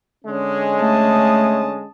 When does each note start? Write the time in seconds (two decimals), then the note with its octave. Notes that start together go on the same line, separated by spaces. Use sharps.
0.25 D3 G#3 C#4
0.80 A3 A5 D#6